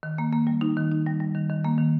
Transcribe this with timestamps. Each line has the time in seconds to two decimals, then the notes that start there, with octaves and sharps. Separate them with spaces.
0.03 D#3
0.18 A#3
0.33 A#3
0.47 G3
0.61 D#4
0.77 D#3
0.91 D#4
1.06 G3
1.21 G3
1.35 D#3
1.50 D#3
1.65 A#3
1.78 D#3